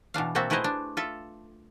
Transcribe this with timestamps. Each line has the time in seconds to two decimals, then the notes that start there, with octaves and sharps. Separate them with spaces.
0.14 B2 E3 D4 F5
0.35 B2 A#3 C4 F#4 E5 A5
0.50 A3 E4 G#4 B4 C5 D#5
0.64 D4
0.97 F4 A4 E5